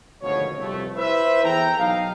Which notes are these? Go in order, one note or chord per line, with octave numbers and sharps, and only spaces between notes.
G#1 D2 B2 F3 C#5
C2 F2 B2 A3
E4 B4 C5 E5
E2 A4 G5 A#5
B1 F#3 D#4 D#5 F5